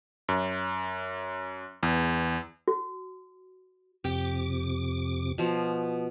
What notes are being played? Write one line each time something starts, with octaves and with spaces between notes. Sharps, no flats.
F#2
E2
F#4
F2 C3 G4 G5 D6
B2 F3